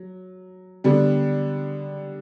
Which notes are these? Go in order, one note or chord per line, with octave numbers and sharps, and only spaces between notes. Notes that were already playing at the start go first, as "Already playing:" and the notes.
Already playing: F#3
D3 G3 B3 D4